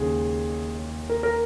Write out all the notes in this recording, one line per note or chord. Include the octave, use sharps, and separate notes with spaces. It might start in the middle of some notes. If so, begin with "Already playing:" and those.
Already playing: D#2 C#3 G#3 G#4
A#4
A#4